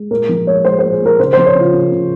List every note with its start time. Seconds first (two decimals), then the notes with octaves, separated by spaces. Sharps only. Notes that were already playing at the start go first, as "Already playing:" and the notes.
Already playing: G#3
0.11 A#2 A#4
0.29 F3
0.47 G#3 C#5
0.65 G#3 C5
0.79 A#2 C5
0.92 G#4
1.01 A#2 A#4
1.19 C#3 C5
1.33 F3 C5
1.46 C#5
1.55 C#3 F4
1.73 C#3
1.91 C#3